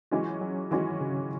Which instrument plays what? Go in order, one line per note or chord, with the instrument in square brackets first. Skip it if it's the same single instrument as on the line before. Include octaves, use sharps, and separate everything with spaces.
[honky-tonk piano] E3 G#3 C#4 F#4 [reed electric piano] F#3
[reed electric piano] F#3
[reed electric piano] D#3 [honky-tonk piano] E3 G#3 C#4 F#4
[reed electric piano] C#3